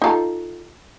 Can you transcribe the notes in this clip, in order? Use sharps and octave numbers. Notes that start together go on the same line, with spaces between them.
D#4 F4 A4